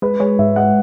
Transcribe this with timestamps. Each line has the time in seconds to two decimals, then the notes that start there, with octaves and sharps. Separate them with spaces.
0.02 G#3 B4
0.20 G#3 C#5
0.39 G#2 E5
0.56 G#3 F#5